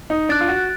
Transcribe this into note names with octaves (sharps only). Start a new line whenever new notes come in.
D#4
D4 F#6 A6 D7
F4
F#4